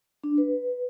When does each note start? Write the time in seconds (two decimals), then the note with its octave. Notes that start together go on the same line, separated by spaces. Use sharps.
0.23 D4
0.38 B4